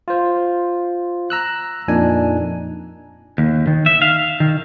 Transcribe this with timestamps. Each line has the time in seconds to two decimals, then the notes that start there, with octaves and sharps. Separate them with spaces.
0.08 F4 C5
1.30 A#5 E6 F#6
1.88 F2 A#2 D4 D#4 G#5
3.38 D#2
3.67 D#3
3.86 E5
4.02 F5
4.40 D#3